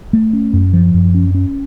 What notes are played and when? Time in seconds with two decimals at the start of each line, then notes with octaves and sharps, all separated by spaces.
0.13 A3
0.33 C#4
0.53 F#2
0.73 F3
0.94 F#2
1.15 C#4
1.35 C#4